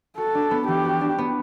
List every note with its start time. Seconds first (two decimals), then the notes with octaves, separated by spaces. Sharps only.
0.18 F#4 A4
0.35 D4
0.51 B3
0.68 E3 G4
0.85 F#4
1.01 D4
1.18 B3